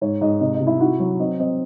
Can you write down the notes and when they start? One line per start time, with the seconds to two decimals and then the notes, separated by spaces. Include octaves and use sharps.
0.01 G#2 C#5
0.21 G#2 D#5
0.41 C3 D#5
0.54 D#5
0.60 C3
0.67 E4 E5
0.80 E4 F#4 F#5
1.00 F#3
1.20 C4 D#5
1.39 C4 D#5